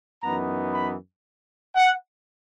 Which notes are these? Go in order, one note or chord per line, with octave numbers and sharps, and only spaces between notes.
F#2 E3 B3 D#4 A#5
B5
F#5